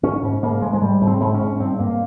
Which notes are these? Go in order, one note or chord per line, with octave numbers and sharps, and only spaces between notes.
G#2 C#4
G#2
G#2 A#3
G#2 G#3
G#3
G#2 G3
G#2
C4
G#2
C#4
G#2
G2 C4
G2 A#3